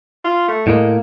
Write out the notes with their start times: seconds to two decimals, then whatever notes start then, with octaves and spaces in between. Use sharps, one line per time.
0.24 F4
0.48 A3
0.67 A2 G#3 A#3